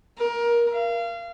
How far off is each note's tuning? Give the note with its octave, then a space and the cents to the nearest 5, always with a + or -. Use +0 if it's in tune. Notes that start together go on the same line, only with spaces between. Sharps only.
A#4 +20
F5 -30